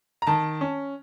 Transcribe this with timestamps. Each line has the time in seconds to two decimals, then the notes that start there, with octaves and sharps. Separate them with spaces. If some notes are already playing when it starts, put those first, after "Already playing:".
0.22 A#5
0.27 D#3 A5
0.61 C#4